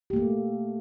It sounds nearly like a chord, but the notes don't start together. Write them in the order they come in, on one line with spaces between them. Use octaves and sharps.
G4 A#3 A3